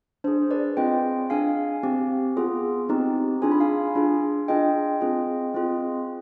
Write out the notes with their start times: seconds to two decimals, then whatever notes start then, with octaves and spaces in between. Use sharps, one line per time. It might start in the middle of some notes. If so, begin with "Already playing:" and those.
0.24 D4 G#4 C5
0.51 B4 D5
0.77 C4 F4 G#4 D#5 G5
1.30 D4 G#4 F5 G#5
1.83 C4 G4
2.37 B3 F4 G#4
2.89 C4 D#4 G4
3.42 D4 F4 G#4 G#5
3.51 B5
3.60 F5 G#5
3.95 D4 F4 G#4
4.48 D4 F4 G#4 D#5 G5
5.01 C4 F4 G#4
5.54 C4 F4 G#4